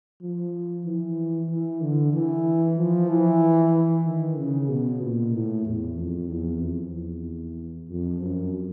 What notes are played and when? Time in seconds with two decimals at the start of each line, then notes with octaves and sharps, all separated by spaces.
0.21 F3
0.85 E3
1.50 E3
1.81 D3
2.14 E3
2.77 F3
3.09 E3
4.05 D#3
4.37 C#3
4.69 B2
5.02 A#2
5.34 A2
5.65 E2
5.97 F2
6.29 E2
6.61 F2
6.93 E2
7.89 F2
8.21 F#2